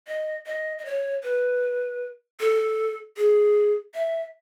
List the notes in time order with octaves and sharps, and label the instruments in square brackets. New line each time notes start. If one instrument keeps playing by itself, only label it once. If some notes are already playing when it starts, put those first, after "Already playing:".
[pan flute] D#5
D#5
D#5
C#5
B4
A4
G#4
E5